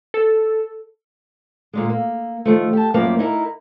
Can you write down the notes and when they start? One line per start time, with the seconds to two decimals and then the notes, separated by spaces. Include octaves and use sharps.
0.14 A4
1.73 A#2 D3 G#3
1.90 A#3
2.45 D#3 F3 A3
2.73 G4 A5
2.94 F#2 F3 A#3 B4 D5
3.19 D#4 E4 A4 A#4